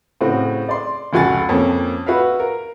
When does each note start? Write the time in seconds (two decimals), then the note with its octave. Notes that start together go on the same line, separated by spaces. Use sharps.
0.21 A2 C#3 C4 F#4
0.69 D5 C6
1.13 F1 C#2 F#4 G#5 A6
1.49 F2 F3 A#3 C#4
2.07 F#4 B4 E5 F5
2.40 A#4